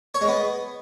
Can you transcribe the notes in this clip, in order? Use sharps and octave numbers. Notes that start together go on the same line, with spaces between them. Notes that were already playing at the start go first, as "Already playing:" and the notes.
C#5
G#3
B3